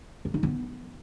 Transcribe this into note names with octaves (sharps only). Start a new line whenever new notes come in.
A#3
D#4
B3